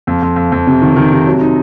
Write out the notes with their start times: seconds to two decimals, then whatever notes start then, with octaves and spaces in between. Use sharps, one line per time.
0.07 F2
0.22 F2
0.36 F2
0.52 F2
0.67 C3
0.82 D#3
0.96 D#3
1.12 C3
1.26 F#3
1.41 D#4